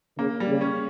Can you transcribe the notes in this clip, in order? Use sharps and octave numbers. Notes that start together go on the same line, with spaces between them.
C#3 A#3
G3
C#3
C#4